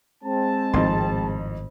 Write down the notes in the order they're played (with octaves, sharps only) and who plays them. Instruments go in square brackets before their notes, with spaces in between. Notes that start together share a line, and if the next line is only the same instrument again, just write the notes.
[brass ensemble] G#3 C4 A5
[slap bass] G#1 A2 [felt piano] F2 D#4 C6